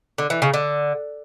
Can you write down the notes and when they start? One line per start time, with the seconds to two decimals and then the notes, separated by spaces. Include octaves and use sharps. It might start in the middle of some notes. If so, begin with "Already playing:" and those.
0.18 D3
0.30 E3
0.42 C#3
0.54 D3